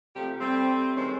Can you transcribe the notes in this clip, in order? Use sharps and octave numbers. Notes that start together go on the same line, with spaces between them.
C3 F3 A3 G4
G3 A3 C4
D#3 G#3 C4 C#4